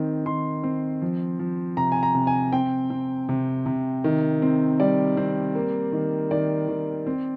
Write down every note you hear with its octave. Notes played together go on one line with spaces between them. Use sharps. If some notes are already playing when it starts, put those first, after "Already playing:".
Already playing: D#3 C4
D#3 C6
C4
F3
F3
C3 A#5
G#5
A#5
C3
G#5
C4 G5
C4
C3
C3
D#3
C4
G3 D5
C4
A#3
D#3
D#3 D5
D#3
C4